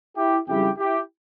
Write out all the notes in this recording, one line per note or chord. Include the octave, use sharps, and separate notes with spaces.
E4 G4
F2 C#3 G3 E4 G4
E4 G4